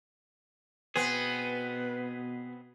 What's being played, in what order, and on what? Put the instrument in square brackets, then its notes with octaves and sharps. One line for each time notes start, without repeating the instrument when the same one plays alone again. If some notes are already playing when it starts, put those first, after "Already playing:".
[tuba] B2 [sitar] B3 C4 [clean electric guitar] G#4 [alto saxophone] B4